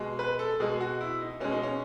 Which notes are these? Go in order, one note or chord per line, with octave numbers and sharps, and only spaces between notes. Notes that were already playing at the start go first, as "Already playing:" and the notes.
Already playing: B2 G#3
B4
A4
B2 G#3 G#4
F#4
E4
D#4
B2 G#3 C#4
D#4
C#4